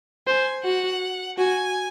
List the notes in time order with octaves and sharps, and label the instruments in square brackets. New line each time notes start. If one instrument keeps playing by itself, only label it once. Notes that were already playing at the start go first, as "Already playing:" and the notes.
[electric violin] C5 [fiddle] G#5
[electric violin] F#4 [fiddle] F#5
[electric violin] F#4 [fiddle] G#5